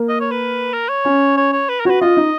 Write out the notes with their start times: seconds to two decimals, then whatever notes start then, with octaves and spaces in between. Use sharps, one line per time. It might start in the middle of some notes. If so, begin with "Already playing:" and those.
Already playing: A#3
0.09 D#5
0.20 C#5
0.31 B4
0.74 A#4
0.89 C#5
1.05 C#4
1.37 C#5
1.53 C#5
1.69 B4
1.80 A#4
1.85 F#4 C#5
1.90 B4
2.01 F4 D#5
2.17 D#4